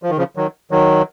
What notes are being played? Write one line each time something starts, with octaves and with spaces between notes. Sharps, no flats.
F3
D#3
C#3 F3
D#3 F#3
D#3 F#3